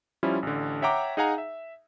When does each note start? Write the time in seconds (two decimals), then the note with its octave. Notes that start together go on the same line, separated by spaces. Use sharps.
0.23 F3 G3 C#4 E4 F4
0.43 A1 D3
0.82 C#5 E5 F#5 G5 A#5 D6
1.17 D#4 G#4 F5 F#5 G#5 A#5
1.38 E5